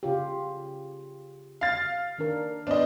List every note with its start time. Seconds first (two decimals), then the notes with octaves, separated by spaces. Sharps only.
0.03 C#3 F4 G4
1.61 F5 A6
2.18 D#3 D4 A#4
2.67 B3 D4 C5 D#5